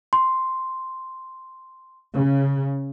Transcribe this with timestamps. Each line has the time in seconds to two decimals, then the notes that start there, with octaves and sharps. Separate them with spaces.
0.13 C6
2.13 C#3